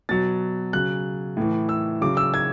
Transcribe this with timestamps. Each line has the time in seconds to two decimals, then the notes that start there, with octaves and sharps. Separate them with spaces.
0.09 B2 F#3 A6
0.73 C#3 F#3 F#6
1.37 A2 E3
1.69 E6
2.01 C#3 F#3 D6
2.17 E6
2.34 G#6